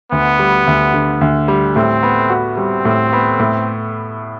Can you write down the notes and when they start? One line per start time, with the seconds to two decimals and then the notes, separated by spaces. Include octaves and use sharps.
0.12 D2 B3
0.39 G3
0.67 D2
0.94 D3
1.21 D2
1.48 G3
1.76 A2 C4
2.03 B3
2.30 F#4
2.57 G3 C4
2.85 A2
3.13 B3
3.39 A2